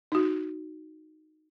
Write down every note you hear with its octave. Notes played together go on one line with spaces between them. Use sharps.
D#4 F#4